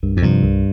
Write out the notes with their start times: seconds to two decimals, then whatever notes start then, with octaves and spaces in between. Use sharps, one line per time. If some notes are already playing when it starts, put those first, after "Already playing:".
0.03 C2 G2
0.17 F2
0.22 G2 C3 F3
0.42 C2